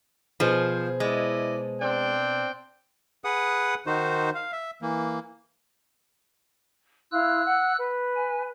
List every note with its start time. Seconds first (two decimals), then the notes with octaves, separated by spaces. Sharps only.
0.40 B2 F3 G#4 C5
1.00 G#3 E4 D5 D#5
1.81 C4 D4 G5
3.24 G#4 B4 F#5 D#6
3.87 D#3 D#4 F#4 C5
4.35 F5
4.52 E5
4.82 E3 A#3
7.12 E4 F5 C6 E6 F#6
7.45 F#5
7.79 B4
8.16 G#5